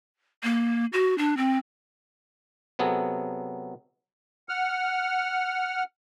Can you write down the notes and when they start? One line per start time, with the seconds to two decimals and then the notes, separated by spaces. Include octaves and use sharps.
0.43 A#3
0.93 F#4
1.18 D4
1.37 C4
2.79 C3 F#3 B3 G#4 A4
4.49 F#5 F6